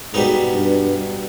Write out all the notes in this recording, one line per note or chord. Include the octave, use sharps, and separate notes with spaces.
G#2 B2 G3 B3 D#4
G2